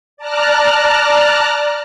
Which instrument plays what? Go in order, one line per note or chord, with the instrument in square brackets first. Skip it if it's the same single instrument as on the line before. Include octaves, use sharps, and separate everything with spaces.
[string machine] D5 A5 A#5 F6 F#6